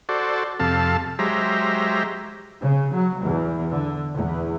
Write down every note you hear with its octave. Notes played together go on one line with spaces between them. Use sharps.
F#4 A4 C5 D5
F2 C3 A4 F5 A5
F#3 G#3 G4 C5 E5 A#5
C#3
F#3
E2
D3
E2